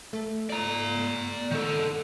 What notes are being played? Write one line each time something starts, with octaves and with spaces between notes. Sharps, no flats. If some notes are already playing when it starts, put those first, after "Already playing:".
A3
D5 A#5
D#3 A4